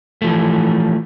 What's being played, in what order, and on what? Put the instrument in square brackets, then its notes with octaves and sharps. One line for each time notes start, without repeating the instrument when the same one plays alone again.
[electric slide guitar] E3 F3 A3